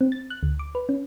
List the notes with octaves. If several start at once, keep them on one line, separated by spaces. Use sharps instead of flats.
C4
A6
F#6
D2
D6
B4
C#4